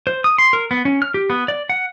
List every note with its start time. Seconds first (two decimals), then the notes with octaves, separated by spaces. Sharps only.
0.07 C5
0.24 D#6
0.38 C6
0.53 A#4
0.71 B3
0.85 C#4
1.02 F6
1.14 G4
1.30 B3
1.48 D5
1.70 F#5